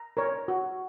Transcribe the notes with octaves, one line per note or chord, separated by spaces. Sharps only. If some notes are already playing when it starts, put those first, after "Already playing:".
Already playing: A#5
A#4 C#5
F#4